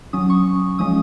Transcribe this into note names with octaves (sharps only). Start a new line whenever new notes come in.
F#3 C#4 D#6
C#6
F3 G#3 C#4 D#6